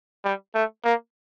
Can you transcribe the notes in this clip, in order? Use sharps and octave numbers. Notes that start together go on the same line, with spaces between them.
G3
A3
A#3